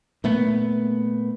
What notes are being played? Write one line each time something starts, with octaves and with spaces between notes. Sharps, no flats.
A#2 A3 B3